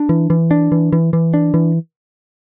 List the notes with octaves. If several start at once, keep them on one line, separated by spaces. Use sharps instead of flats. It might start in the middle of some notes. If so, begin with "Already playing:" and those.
Already playing: D4
E3
E3
D4
E3
E3
E3
D4
E3